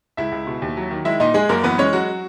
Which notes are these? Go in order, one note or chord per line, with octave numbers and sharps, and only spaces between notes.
C#2 E4 E5
C#2
B2
D#2
F#3
D#3
G#3 E4 E5
A#2 D#4 D#5
G#3 G#4
F#2 A#3 A#4
E3 B3 B4
G#3 C#4 C#5
F#3 F#4